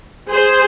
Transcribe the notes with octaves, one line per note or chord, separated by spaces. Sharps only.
G#4 C5